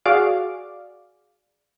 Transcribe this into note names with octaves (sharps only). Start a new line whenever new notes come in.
F#4 G#4 D5 F5 D6